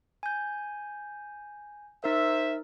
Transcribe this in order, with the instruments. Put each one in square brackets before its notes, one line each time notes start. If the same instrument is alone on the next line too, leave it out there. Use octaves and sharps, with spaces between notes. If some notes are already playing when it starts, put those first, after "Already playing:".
[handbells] G#5 G6
[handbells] D#4 A#4 [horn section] C5 E5